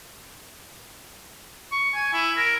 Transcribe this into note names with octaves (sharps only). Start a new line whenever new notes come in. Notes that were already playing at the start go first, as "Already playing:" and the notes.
C#6
G#5
E4
A#4